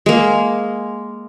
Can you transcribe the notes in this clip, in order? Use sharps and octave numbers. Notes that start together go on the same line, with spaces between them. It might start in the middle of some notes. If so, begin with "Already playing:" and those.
G#3 A#3